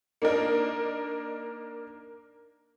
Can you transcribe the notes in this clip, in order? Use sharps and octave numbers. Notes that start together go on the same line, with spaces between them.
A#3 D4 D#4 A#4